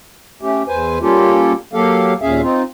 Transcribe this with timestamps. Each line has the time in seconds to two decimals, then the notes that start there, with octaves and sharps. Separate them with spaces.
0.41 A3 C#4 G4
0.67 E2 B4 C5 G#5
1.01 G3 A#3 C#4 F4 G4 A4
1.73 F#3 A#3 G4 A4 F5
2.22 D#2 A#2 C#4 G#4 E5 F5
2.42 C4 D#4 F4